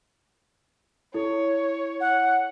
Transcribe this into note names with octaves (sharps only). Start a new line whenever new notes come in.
E4 A4 C#5
F#5